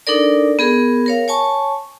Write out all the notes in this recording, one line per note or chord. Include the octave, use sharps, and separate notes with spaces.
D4 D#4 A4 A#4 D5
B3 G#4 A#4
A#4 C#5 F5
C#5 G#5 A5 C#6